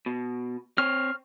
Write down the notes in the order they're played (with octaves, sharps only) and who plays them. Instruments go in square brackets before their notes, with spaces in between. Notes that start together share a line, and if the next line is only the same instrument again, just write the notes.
[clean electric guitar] B2
[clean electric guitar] C4 C#5 [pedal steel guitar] F6